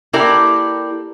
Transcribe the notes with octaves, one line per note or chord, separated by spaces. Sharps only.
A#3 E4 G4 A4 A#4 D5